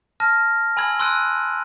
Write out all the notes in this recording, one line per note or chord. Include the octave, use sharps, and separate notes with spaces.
A5 F6 A#6
G#5 B5 E6 G#6 F#7
C6 E6 F#6 D7 D#7